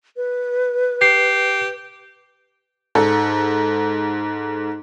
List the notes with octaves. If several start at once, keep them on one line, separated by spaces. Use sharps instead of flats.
B4
G4 C7
G#2 A4